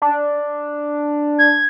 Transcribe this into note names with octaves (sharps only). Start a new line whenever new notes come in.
D4
G#6